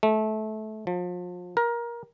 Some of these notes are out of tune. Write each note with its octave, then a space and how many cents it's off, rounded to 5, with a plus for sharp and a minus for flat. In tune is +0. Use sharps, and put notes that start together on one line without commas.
A3 -25
F3 +35
A#4 +20